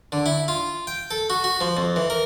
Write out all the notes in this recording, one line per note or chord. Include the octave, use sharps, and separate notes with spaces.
D3
E4
F4
G5
A4
F#4
F#4
F3
F2
E3
A#4